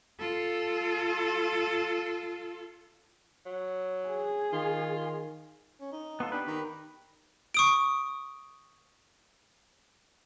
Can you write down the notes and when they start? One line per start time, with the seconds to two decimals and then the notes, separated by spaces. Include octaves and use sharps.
0.20 F4 A4
3.46 F#3
4.08 G#4
4.53 D#3 F4
5.81 C#4
5.92 D#4
6.20 B3 F4 A4
6.32 D4 G4 B4
6.47 D#3
7.54 C#6 D#6 D7